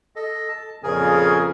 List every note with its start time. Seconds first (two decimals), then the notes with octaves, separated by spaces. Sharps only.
0.16 A4 D#5
0.49 A5
0.83 F2 A#2 C#3 G#4 A#4 G#5